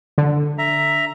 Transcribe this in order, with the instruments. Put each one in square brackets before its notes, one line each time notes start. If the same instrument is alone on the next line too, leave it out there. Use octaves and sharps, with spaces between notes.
[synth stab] D3
[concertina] E5 A#5